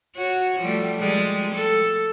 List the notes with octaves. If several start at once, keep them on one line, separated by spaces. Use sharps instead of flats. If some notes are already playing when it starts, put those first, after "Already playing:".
F#4 C#5
F3 G3 A3
F3 G3 G#3
A4